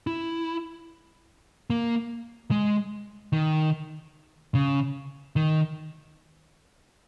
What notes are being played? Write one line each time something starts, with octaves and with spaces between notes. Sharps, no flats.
E4
A#3
G#3
D#3
C#3
D#3